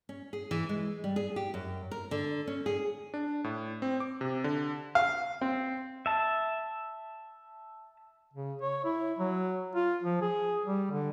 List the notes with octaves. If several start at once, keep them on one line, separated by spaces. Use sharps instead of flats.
C#4
G#4
E3
G#3
G3
G#4
G4
F#2
A#4
D3
C#4
G#4
D4
A2
C4
D6
C3
D3
F5
C4
E5 A5
C#3
C#5
E4
F#3
F4
F3
G#4
G3
D3